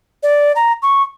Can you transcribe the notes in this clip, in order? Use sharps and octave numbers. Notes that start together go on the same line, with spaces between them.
D5
A#5
C#6